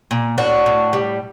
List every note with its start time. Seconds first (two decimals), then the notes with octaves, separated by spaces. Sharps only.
0.11 A#2
0.38 A2 D4 F#4
0.66 A2
0.93 G3